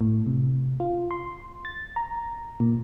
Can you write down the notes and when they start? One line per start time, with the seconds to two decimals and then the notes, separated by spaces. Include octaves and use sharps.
0.01 A2
0.27 C3
0.80 F4
1.11 C6
1.65 A6
1.96 A#5
2.60 A#2